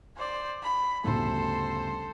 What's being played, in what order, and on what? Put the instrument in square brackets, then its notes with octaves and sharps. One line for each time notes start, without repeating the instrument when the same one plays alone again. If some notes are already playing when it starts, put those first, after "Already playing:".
[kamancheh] C5 D5
B5
[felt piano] G1 D2 C#3 [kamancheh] A4 C5